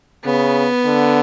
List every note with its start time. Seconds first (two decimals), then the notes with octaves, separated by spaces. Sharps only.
0.25 C#3 B3
0.86 D3